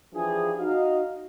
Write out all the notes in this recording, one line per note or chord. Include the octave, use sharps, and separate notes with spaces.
E3 F3 D4 F4 G4 G#4
D#4 F#4 D#5 F5